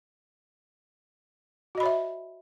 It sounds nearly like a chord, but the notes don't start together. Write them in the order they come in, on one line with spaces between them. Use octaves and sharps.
F#4 D#5 B5 C#5 E5